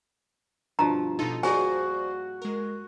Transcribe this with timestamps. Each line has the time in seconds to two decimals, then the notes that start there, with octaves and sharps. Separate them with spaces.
0.79 G2 B2 F3 A#5
1.19 B2 D#4 F4 A4
1.43 A#3 F#4 G#4 C5 D5 D#5 G#5
2.42 G#3 A#4